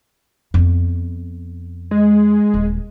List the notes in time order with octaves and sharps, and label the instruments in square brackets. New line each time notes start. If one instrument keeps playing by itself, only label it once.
[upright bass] F2 B3
[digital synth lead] G#3
[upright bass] D#1